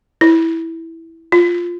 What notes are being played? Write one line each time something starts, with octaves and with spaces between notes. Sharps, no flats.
E4
F4